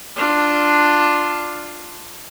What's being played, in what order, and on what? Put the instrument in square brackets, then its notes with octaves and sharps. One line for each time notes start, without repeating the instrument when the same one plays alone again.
[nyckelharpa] D4 F4